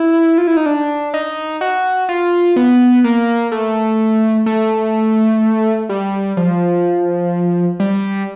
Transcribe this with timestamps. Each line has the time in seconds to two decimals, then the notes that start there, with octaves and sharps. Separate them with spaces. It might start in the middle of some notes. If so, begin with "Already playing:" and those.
Already playing: E4
0.38 F4
0.47 E4
0.57 D#4
0.66 D4
1.14 D#4
1.61 F#4
2.09 F4
2.56 B3
3.04 A#3
3.52 A3
4.46 A3
5.89 G3
6.37 F3
7.80 G3